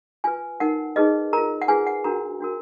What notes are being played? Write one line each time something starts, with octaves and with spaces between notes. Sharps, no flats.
F4 B4 G#5
D#4 A#4 F#5
D#4 G#4 B4 D#5
F4 A#4 A#5
F#5
F4 G#4 B4 G#5
F#5
D4 F#4 A#4 A#5
D4 F#4 A#4